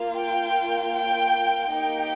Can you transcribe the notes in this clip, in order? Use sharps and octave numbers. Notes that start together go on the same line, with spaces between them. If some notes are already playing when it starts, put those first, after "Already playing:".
Already playing: A#3 F4
G5
G5
A#3 D#4 G4 G5